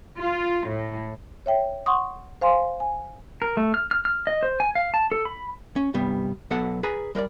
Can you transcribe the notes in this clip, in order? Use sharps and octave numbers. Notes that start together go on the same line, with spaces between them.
F4
A2
C#5 E5 G5
F#5 C6 C#6 D#6
C5 F5 G#5 C6
G#5
A#4
A3
F6
F6
F6
D#5
C5
G#5
F5
A5
A4
B5
C#4
G2 C3 G3 B3
B1 F#3 B3 A4 F#5 A5
G#4 B4 G#5 A#5
G3 A#4 B4 D5